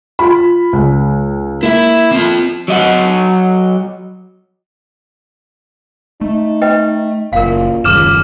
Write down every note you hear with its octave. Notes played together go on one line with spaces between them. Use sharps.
F4 B5
C#2
A#3 E4 E5
C4 F4
F#3 D#5 F#5
A3 D#4
B4 D#5 G5
F#1 A#2 A#4 F5
D#1 C#2 F#2 D#3 D6 F6 E7